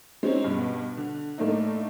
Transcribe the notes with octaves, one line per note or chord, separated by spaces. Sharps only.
G#3 C4 C#4 D#4
G2 B2
D3
A2 A3 A#3 D4 D#4